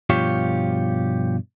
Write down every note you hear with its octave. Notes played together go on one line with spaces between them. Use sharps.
G2 B2 F3 F4 G4 C#5